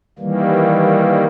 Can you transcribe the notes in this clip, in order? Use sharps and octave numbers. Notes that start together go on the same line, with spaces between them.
D#3 E3 G3 A#3